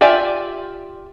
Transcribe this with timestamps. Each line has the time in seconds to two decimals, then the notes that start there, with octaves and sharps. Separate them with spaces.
0.01 F4 G4 D5 E5 G#5